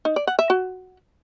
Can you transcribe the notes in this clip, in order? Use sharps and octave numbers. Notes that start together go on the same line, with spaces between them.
D#4
D5
F#5
E5
F#4